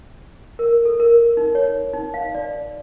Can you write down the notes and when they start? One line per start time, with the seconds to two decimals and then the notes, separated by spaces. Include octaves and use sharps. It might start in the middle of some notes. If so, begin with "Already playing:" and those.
0.59 A#4
0.85 A4
1.00 A#4
1.37 D#4
1.55 C#5
1.94 D#4
2.14 F5
2.35 D5